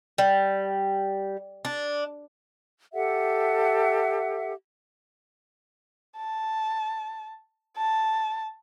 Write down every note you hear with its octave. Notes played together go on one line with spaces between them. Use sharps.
G3
D4
G4 A4 E5 F#5
A5
A5